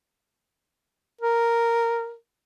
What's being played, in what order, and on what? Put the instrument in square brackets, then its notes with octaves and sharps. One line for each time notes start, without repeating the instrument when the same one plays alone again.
[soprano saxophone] A#4